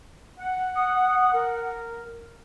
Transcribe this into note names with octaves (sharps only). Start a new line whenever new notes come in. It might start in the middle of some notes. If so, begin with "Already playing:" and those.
F#5
D#6
A#4